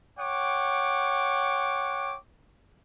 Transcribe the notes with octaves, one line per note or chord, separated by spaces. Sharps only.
C#5 F#5 G5 D6